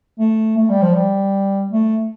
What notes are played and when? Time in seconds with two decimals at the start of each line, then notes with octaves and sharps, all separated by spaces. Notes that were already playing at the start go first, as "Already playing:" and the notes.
0.19 A3
0.58 A3
0.70 G3
0.82 F3
0.94 G3
1.71 A3